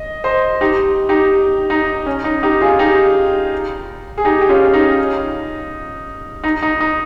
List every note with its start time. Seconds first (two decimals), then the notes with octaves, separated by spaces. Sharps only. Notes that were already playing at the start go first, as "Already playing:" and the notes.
Already playing: D#5
0.24 C5 D#5
0.61 D#4 G4
1.09 D#4 G4
1.70 D#4
2.06 C#4
2.24 D#4
2.43 D#4 G4
2.61 F4 G#4
2.79 D#4 G4
4.18 G#4
4.25 D#4 G4
4.42 G4
4.49 C#4 F4
4.74 D#4
6.44 D#4
6.62 D#4
6.80 D#4